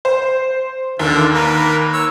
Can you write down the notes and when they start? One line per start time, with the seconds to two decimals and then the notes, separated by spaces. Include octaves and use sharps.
0.05 C5
0.99 D#2 D3 F4
1.34 A#3 A#4 B4
1.93 C#5 E6